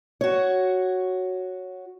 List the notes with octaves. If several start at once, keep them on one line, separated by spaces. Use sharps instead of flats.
F#4 C#5